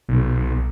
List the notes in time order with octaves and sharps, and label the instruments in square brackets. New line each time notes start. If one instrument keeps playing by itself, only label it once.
[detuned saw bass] B1